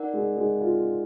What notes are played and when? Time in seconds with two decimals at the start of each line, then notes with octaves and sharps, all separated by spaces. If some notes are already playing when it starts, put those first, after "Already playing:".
Already playing: D#4 A#4 D5 F#5
0.14 G#3
0.37 G#3
0.61 F4